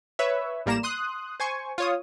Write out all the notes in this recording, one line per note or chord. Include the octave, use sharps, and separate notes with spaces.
B4 C#5 E5
A1 G3 A#3 A#5 E7
C6 D#6 F#6
C5 G#5 C#6
F4 C#5 D#6